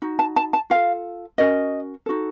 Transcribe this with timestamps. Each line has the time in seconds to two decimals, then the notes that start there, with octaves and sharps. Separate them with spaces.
0.02 D#4 F#4
0.19 A5
0.36 A5
0.53 A5
0.70 F4 A4 F5
1.38 C#4 F#4 A#4 D#5
2.06 D#4 F#4 A4